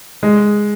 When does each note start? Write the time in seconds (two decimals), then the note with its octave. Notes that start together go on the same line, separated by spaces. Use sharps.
0.23 G#3